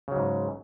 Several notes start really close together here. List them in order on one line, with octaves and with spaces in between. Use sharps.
C#3 F#3 G#2